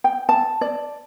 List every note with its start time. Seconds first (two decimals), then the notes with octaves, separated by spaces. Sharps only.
0.04 G5
0.29 A5
0.61 D5